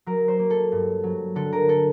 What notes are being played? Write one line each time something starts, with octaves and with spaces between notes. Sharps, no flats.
F#3 A#4
C5
A#3
A4
G2
F#3
D3 A4
A#4
A4